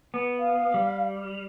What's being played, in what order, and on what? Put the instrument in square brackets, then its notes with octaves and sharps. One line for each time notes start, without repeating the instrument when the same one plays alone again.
[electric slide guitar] B3
[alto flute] F5
[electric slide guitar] G3